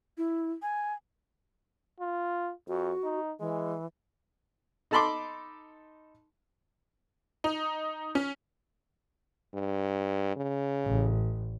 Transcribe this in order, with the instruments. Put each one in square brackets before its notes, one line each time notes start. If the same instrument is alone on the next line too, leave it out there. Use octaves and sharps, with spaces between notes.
[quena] E4
G#5
[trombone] F4
[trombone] F2 [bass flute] F#4
[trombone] D#4
[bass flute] E3 [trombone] G#3
[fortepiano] D#4 A4 A5 B5 C6 D6
[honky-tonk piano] D#4
C#4
[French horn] G2
C#3
[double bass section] A1